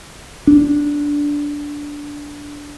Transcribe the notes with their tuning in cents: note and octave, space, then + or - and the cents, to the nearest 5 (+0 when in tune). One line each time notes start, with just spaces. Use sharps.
D4 -10